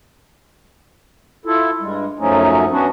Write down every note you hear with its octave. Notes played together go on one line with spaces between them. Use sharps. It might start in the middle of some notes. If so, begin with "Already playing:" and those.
E4 F4 A4
G2 G3 G#3
F#2 F3 F#3 A3 C#4 D#4
B3 C#4 D4 F#4